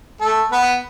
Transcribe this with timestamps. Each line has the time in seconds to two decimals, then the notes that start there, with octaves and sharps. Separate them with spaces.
0.20 A3 A4
0.52 B3 B4